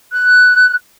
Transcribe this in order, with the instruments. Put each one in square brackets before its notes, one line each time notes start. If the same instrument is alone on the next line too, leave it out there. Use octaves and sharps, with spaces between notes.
[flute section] F#6